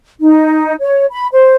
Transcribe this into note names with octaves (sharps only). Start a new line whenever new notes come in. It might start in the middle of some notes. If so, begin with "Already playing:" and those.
D#4
C#5
B5
C5